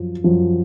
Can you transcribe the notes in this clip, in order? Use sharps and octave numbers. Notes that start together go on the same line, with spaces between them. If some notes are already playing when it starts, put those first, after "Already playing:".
Already playing: F#2 F3
F#2 F3